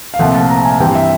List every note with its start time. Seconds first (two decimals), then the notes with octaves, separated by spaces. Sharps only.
0.14 F5
0.19 C2 A#2 F3 A3 C4 F#5
0.34 A5
0.49 A#5
0.65 G#5
0.80 G2 E3 G3 C4 G5
0.95 E5